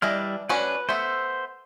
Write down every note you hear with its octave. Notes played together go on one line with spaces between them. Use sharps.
E3 G3 D4 E4 D#5 F6
F#3 C#4 D4 B4
A3 B3 C5 E6